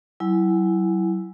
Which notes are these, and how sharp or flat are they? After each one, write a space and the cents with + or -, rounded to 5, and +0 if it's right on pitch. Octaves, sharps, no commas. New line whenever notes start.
F#3 +30 E4 +0 G#5 +0